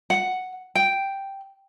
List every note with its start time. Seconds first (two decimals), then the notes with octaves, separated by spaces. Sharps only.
0.10 F#5
0.75 G5